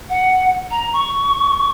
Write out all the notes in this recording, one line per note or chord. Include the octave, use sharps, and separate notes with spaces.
F#5
A#5
C#6